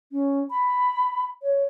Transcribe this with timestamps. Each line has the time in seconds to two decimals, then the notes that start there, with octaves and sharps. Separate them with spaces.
0.12 C#4
0.50 B5
1.42 C#5